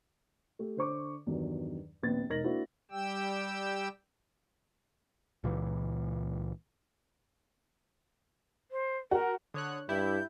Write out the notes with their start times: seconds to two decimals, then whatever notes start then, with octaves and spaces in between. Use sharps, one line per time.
0.59 A3 G4
0.77 D3 C5 C#6 D6
1.27 E2 G2 D#3 F#3
2.03 A#1 D#2 B3 C4 A6
2.29 E1 D#4 A#4 A#6 F#7
2.44 A#3 D4 E4 F#4 C5
2.91 G3 G4 G5 E6
5.44 C#2 A#2 E3
8.71 C5
9.11 F#4 A#4
9.54 D3 C#5 D#6 F#6
9.89 G2 E4 G4 G6